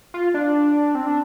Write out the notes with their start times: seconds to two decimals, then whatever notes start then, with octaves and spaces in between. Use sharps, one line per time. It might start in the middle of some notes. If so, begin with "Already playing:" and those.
0.14 F4
0.34 D4
0.95 C4
1.06 D4